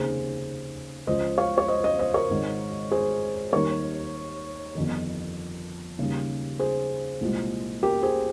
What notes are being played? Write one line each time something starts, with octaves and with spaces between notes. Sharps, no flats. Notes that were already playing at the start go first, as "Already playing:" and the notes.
Already playing: F1 D#2 C#3 G#4 C5
C#2 C#3 F3 G#3 C5 D#5
C#5 F5
C#5
C5 D#5
C5 D#5
C5 D#5
A#4 C#5
G#1 G#2 D#3 G#3
G#4 C5
D#2 D#3 G3 A#4 C#5
G1 F2 D#3
D#2 C#3 G3
G#4 C5
C2 A#2 F3 G#3
G4 A#4
G#4 C5